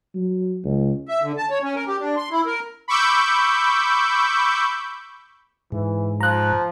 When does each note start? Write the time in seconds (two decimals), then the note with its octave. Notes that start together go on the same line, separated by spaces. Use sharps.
0.14 F#3
0.64 C#2
1.08 E5
1.23 D3
1.38 A5
1.50 C#5
1.63 C#4
1.75 A#4
1.87 G4
2.00 D4
2.17 C6
2.31 E4
2.46 A#4
2.88 B5 C#6 D6 E6 G6
5.72 G#2 E3
6.21 F3 A#5 F#6